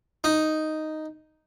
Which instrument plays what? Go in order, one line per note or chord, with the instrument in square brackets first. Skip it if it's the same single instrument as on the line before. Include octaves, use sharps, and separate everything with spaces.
[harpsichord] D#4